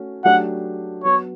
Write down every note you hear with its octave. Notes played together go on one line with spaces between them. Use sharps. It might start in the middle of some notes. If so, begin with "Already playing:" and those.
Already playing: A3 C#4 F#4
F#3 A3 D4 G4 F#5
F#3 B3 F#4 C#5